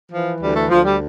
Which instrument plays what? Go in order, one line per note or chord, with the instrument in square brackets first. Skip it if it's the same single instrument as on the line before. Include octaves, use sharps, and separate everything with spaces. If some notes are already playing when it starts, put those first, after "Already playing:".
[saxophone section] E3 F3
D2 G3
A3
D2 F3
G3